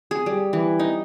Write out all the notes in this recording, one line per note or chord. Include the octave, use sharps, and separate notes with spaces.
G#4
G3
E3
D#4